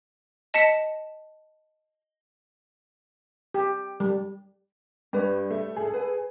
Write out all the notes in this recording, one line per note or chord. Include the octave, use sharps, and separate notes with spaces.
D#5 A5 B6 C#7 E7
G4
G3
G2 G4 B4 C#5
A3
G#4 A4
B4 G#5